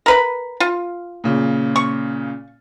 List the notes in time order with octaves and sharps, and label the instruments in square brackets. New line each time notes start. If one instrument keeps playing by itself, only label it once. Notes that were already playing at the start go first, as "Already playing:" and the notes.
[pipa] A#4 B4 B5
F4
[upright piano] A#2 C#3
[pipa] C#6